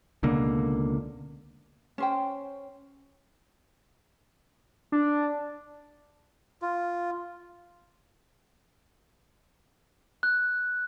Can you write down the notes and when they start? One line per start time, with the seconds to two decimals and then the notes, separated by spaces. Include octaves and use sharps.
0.23 C#2 B2 D3 A#3
1.98 C#4 C5 G5
4.92 D4
6.62 F4
10.23 F#6